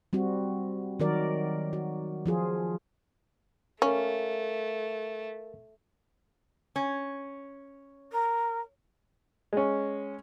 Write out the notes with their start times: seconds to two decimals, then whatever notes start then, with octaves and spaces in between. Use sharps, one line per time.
0.13 G3 C4 F#4
1.00 D#3 F#3 F#4 A#4 D5
1.73 F#4
2.26 F3 F4 G#4
3.82 A3 C#4 A#4 F5
6.76 C#4
8.11 A#4
9.53 G#3 C#4